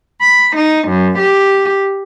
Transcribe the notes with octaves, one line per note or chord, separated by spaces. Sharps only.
B5
D#4
F#2
G4